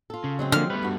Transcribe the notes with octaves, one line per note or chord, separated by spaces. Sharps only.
F4 A4
C#3
F#3 G#3 C4
D3 F3 A#3 F6
G3 A3 B3 B4
G2 F#4